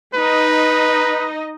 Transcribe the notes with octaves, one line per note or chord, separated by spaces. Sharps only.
D#4 B4 D#5